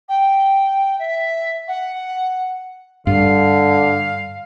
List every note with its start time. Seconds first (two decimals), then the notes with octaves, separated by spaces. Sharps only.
0.08 G5
0.99 E5
1.68 F#5
3.07 G2 D3 F5